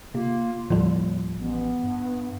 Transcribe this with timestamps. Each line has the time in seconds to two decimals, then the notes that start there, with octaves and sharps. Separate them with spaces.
0.15 C3 A#3 F4
0.70 D#2 A2 D3 F3 G3
1.38 A1 B3
1.84 G2